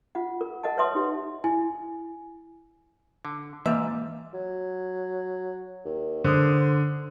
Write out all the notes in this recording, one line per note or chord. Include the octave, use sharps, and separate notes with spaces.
F4 F#5
A#4
A#4 D#5 F#5 A5
B4 C#5 E5 A5 C6 D#6
D#4 G4
E4 G#5
D3
G#2 E3 G3 A#3 E5
F#3
D#2
D3 C5 D#6